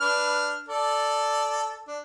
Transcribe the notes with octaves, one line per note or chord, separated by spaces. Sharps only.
D4 B4 F6
A4 D5
D4